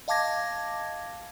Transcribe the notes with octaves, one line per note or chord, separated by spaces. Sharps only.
D#5 F5 A5 D6 G#6 A#6